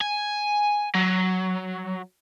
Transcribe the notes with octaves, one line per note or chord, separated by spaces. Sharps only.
G#5
F#3